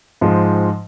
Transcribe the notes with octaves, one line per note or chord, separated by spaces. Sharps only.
G#2 F3 G#3